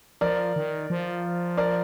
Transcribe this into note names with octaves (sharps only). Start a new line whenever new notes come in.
F3 A#4 D5
D#3
F3
A#4 D5